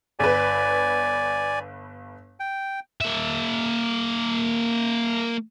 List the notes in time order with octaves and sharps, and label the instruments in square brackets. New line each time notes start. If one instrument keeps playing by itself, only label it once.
[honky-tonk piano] G1 B4 [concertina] D5 G#5
[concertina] G5
[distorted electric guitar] A#3 E5